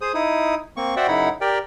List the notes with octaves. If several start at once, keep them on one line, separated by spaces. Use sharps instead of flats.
G#4 C5 D#6
D#4 E4 D#6
A#3 C4 C#6
F#4 C5 D5 E5 F#5 G5
F#2 C#3 D#4 E4 F#5 B5
G4 A#4 D5 G5